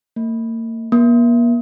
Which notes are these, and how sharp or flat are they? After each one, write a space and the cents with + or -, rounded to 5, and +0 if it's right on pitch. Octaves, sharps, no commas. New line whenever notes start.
A#3 -40
A#3 +40